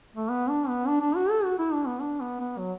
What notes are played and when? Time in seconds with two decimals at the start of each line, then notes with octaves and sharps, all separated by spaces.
0.16 A3
0.30 B3
0.49 D4
0.68 B3
0.87 D4
1.01 D4
1.16 F#4
1.30 A4
1.44 F#4
1.58 E4
1.73 D4
1.87 B3
2.01 D4
2.20 B3
2.40 B3
2.58 F#3